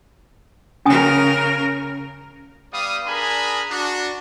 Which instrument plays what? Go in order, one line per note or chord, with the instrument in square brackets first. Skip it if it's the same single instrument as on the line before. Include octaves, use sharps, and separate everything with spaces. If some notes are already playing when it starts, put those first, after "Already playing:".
[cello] C#3 A#4 [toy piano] C#4 G#5 D#6
[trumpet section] G3 B3 D5 F5 D#6
D4 G#4 A#4 G#5 A#5 B5
D4 F#4